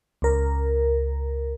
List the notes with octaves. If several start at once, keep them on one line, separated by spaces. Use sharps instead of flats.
C#2 A#4